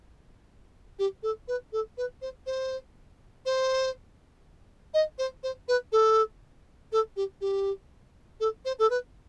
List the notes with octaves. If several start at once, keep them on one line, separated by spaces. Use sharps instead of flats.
G4
A4
B4
A4
B4
C5
C5
C5
D#5
C5
C5
B4
A4
A4
G4
G4
A4
C5
A4
B4